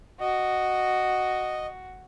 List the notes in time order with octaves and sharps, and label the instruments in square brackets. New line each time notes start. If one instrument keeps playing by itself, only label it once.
[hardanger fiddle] F#4 [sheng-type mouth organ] D#5